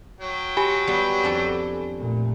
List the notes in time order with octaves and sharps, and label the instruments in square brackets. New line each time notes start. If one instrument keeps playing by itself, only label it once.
[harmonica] F#3 G5
[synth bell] G4 G#5 B5 [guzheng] D#5
[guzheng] G3 B3
F2 D4 A4
[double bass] A#2 A3